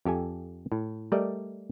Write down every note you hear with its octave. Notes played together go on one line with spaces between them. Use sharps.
F2 G4 A4 G#5
A2
G3 A3 A#4 D5 D#5